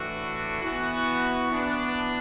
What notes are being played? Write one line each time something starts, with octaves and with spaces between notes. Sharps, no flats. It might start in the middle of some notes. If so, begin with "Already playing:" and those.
Already playing: A2 E3 A3 D4 F#4
E3 B3 F#4
E3 B3 D4